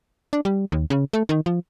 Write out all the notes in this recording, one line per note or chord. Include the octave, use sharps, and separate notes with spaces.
D4
G3
D#2
C#3
A3
D#3
F3